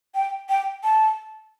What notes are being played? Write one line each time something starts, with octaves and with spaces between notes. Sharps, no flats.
G5
G5
A5